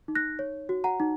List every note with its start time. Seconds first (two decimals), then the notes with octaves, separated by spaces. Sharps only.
0.08 D#4
0.15 F#6 A#6
0.39 C#5
0.69 F#4
0.84 F#5 A#5
1.00 D#4